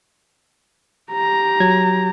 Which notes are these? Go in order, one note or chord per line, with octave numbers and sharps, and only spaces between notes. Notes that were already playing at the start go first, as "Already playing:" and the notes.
G4 A#5
F#3 G#6